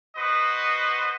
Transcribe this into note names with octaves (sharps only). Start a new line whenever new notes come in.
F#4 B4 C5 D#5